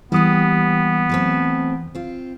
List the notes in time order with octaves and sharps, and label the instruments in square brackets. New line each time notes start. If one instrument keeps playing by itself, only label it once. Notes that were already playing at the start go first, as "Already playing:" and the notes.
[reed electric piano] E3 D#6 [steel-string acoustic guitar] G3 A#3 G4 [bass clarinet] B3
[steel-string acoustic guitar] F#3 A3 C4
C4 F4